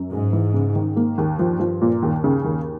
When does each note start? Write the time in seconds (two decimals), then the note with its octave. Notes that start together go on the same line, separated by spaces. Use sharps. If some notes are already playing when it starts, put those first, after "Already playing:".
Already playing: F#2
0.12 G#2 G#3
0.33 E3
0.54 C#3
0.75 D#3
0.96 A#3
1.18 D#2
1.39 G2 F3
1.60 F3
1.82 A#2
2.03 D#2
2.24 C#3
2.45 D#2